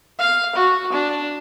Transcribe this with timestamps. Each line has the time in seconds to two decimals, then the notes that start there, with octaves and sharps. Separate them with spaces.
0.19 F5
0.55 F#4
0.92 D4